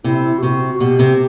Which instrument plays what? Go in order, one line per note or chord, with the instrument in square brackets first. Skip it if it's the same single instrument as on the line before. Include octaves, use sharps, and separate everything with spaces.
[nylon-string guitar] C3 [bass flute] E4
[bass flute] G4
[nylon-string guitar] C3 [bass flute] F#4
[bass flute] F#4
[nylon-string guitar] B2 [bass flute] G4
[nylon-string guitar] C3